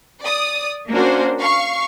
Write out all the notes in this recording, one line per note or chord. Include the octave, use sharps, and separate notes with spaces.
D5 D#6
A#3 C#4 D4 F#4 A#4 C5
F5 C#6 C7